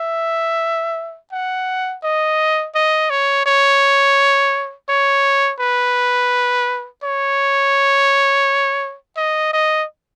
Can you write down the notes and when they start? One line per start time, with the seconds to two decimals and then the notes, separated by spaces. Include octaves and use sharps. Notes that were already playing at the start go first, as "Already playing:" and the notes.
Already playing: E5
1.32 F#5
2.03 D#5
2.75 D#5
3.10 C#5
3.46 C#5
4.89 C#5
5.59 B4
7.03 C#5
9.17 D#5
9.53 D#5